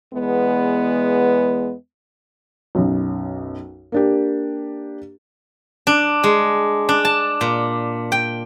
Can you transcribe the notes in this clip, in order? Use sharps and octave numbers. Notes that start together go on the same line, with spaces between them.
E2 G#3 B3
B1 F#2
A#3 D4 G4
D4
G#3
D4
A5
A#2
G5